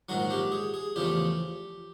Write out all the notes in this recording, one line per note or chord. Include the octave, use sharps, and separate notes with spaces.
A#1 G#2 D#3 F#3 F#4
G4
G#4
G#4
E2 C#3 F3 A3 G4